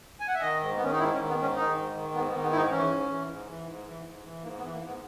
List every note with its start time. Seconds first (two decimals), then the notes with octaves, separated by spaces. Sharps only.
0.20 G#5
0.28 F#5
0.35 E5
0.41 D#3 D#5
0.61 G#2
0.76 B3
0.81 D#3 C#4
0.92 D#4
0.99 G#2 E4
1.14 C#4
1.18 D#3
1.28 B3
1.38 G#2 C#4
1.56 D#3 D#4
1.76 G#2
1.95 D#3
2.14 G#2 B3
2.29 B3
2.33 D#3
2.42 B3
2.52 G#2 D#4 E4
2.71 E3 C#4
2.91 G#2
3.10 E3
3.29 G#2
3.48 E3
3.67 G#2
3.86 E3
4.05 G#2
4.24 E3
4.43 G#2 A#3
4.57 B3
4.63 E3
4.73 A#3
4.82 G#2 B3